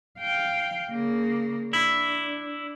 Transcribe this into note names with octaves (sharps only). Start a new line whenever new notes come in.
F5 G5
C#3 A#3
D4 E4